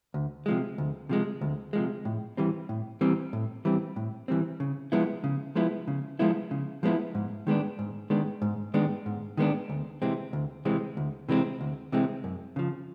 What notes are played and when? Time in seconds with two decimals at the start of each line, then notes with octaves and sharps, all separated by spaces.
0.14 D2
0.46 C3 F3 G#3
0.78 D2
1.09 C3 F3 G#3
1.41 D2
1.73 C3 F3 G#3
2.05 A2
2.37 E3 G3 C4
2.69 A2
3.01 E3 G3 C4
3.33 A2
3.65 E3 G3 C4
3.96 A2
4.28 E3 G3 C4
4.60 C#3
4.92 F3 G#3 B3 E4
5.24 C#3
5.55 F3 G#3 B3 E4
5.88 C#3
6.19 F3 G#3 B3 E4
6.51 C#3
6.83 F3 G#3 B3 E4
7.15 G#2
7.47 D#3 G#3 B3 D4
7.79 G#2
8.10 D#3 G#3 B3 D4
8.42 G#2
8.74 D#3 G#3 B3 D4
9.06 G#2
9.37 D#3 G#3 B3 D4
9.69 D2
10.02 C3 E3 G#3 C4
10.33 D2
10.65 C3 E3 G#3 C4
10.97 D2
11.29 C3 E3 G#3 C4
11.61 D2
11.92 C3 E3 G#3 C4
12.24 F#2
12.56 C#3 F3